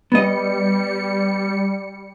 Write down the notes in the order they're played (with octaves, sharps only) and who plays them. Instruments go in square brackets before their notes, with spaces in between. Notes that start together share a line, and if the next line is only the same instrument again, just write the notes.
[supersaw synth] G3 C#7 [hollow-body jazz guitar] B3 D#5